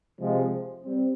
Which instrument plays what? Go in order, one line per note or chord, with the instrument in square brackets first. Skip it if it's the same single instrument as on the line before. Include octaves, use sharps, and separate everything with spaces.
[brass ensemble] C3 F3 G#3
G3 C4